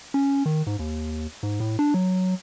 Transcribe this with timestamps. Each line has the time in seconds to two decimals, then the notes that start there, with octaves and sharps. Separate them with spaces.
0.14 C#4
0.46 D#3
0.67 G#2
0.79 D#2
1.43 G#2
1.60 A2
1.79 D4
1.94 F#3